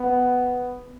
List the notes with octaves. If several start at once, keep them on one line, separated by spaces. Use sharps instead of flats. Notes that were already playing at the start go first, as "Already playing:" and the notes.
Already playing: B3